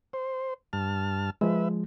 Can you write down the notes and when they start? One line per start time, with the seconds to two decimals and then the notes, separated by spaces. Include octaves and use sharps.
0.13 C5
0.73 G2 A5 F6
1.41 F3 G#3 B4 E5